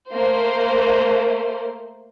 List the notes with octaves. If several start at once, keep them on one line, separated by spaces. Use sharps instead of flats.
A3 A#3 C5